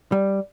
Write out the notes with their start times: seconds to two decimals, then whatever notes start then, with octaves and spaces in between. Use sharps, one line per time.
0.12 G3